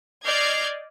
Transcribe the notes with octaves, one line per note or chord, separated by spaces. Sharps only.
D5 D#5 F6 G6 G#6 C7